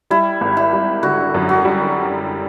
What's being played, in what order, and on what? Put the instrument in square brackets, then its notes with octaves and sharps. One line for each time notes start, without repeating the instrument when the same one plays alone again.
[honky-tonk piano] G3 [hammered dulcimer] E4
[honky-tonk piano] G#1
[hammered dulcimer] E4
[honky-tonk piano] G3
[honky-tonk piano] D3 [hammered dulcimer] F#4
[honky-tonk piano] F#2
[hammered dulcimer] F#4
[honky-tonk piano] G3